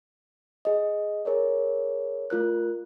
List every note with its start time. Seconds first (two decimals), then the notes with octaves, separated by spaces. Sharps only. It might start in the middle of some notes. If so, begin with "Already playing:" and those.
0.65 G#4 D#5
1.25 G#4 A#4 C#5 D5
2.30 A3 F4 A#4 F#6